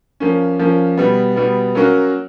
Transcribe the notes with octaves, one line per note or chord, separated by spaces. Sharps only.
F3 A#3 C#4
F3 A#3 C#4
B2 G3 B3
B2 G3 B3
F#3 A#3 C#4 F#4 A#4